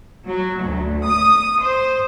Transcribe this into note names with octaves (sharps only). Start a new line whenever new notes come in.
F#3
D2
D#6
C5